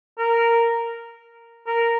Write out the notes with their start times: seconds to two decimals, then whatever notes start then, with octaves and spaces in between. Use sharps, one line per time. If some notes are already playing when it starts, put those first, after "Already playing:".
0.18 A#4
1.67 A#4